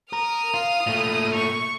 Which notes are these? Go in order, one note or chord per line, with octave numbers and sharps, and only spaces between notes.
A#4 D#6 F6
F4
A#2 A3
C#6